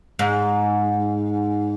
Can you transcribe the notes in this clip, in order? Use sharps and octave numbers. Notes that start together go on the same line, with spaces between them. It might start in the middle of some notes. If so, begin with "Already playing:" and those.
G#2